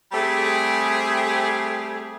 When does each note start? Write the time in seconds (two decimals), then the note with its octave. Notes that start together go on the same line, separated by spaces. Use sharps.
0.12 G3 A3 C4 G4 G#4